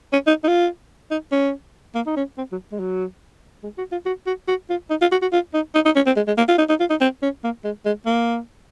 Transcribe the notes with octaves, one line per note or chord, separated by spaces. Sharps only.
C#4
D#4
D#4
F4
D#4
C#4
A#3
D#4
C#4
C4
F#3
G#3
F#3
G#3
F#4
F4
F#4
F#4
F#4
F4
D#4
F4
F#4
F#4
F4
D#4
D#4
D#4
C#4
C4
G#3
G#3
A#3
F4
D#4
D#4
F4
D#4
C4
C#4
A#3
G#3
G#3
A#3